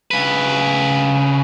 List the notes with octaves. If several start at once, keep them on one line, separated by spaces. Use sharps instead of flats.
C#3 B4